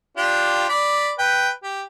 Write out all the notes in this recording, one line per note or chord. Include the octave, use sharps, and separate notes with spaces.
D4 F4 G4
D5 B5
B4 G5
G4